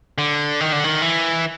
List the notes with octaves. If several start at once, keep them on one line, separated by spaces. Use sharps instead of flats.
D3
D#3
D3
D#3
E3